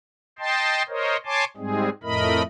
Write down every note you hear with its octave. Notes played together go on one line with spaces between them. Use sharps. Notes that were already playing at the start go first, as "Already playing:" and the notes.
D#5 G5 A5 C6
A#4 C5 C#5 D#5
C#5 G#5 A5 C6 D6
G#2 G3 G#3 C4 G#4
F2 A2 A3 A#4 D#5 B5